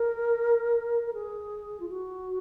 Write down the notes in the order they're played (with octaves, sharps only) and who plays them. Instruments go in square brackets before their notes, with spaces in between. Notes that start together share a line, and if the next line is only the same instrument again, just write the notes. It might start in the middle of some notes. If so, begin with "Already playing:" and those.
Already playing: [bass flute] A#4
A#4
G#4
F4
F#4